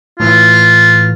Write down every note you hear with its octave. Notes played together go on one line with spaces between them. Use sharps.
A2 E3 F4